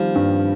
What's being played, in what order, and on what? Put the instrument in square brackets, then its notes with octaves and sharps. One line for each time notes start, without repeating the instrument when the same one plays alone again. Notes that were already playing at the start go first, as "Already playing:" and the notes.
Already playing: [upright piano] D#3 G3 [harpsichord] F3
[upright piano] G2